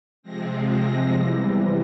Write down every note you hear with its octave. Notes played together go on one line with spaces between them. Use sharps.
C3 F3 G#3 C4 A#6
A#6
E2 C3 E3 G3